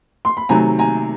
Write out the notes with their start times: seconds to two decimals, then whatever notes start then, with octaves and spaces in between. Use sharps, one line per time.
0.25 C6
0.37 B5
0.49 C3 D#3 F#3 A3 G#5 A#5
0.79 G#5 A#5